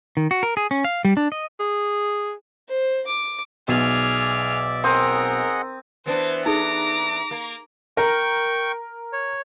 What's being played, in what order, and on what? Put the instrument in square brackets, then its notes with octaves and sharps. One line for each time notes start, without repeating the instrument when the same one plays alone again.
[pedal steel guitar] D#3
F#4
A#4
G#4
C#4
F5
G3
D4
D#5
[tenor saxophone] G#4
[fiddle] C5
D6
[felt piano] B1 [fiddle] G#4 F6 [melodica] D5 E5 D6
[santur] C4 D#6 [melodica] G#4 D#5 F#5 [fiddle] A#4
[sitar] E3 B3 D4 [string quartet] C5
[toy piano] D#4 G#4 A4 [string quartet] A#5 D6
[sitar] A#3
[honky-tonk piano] A#4 [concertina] G5 C#6
[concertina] C#5